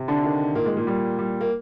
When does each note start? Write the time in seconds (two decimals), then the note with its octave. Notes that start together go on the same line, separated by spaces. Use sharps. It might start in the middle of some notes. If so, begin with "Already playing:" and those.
Already playing: C3
0.08 D3 D4
0.24 D#3
0.55 A#2 A#3
0.66 G#3
0.77 A#2 A#3
0.87 G3
1.19 G3
1.41 A#3